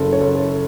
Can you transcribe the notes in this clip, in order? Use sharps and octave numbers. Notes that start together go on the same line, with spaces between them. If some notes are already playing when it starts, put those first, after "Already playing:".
Already playing: F#1 A4
C#5
F#1
A4